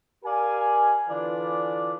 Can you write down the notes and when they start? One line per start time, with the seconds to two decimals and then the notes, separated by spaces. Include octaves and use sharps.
0.24 G4 A#4 D5 F5 G#5
1.09 D3 E3 D4 F4 B4 D5